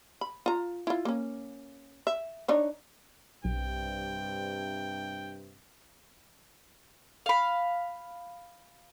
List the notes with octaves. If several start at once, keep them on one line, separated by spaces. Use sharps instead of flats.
B5
F4 A#5
E4 F4
A#3 C#4
E5
D4 D#4 C#5
B1 G2 C3 G5
F5 B5